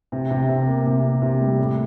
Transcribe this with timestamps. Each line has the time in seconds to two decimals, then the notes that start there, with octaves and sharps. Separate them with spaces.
0.12 C3
0.31 C3
0.49 C3
0.67 A#3
0.86 C3
1.04 C3
1.22 C3
1.41 G3
1.58 A2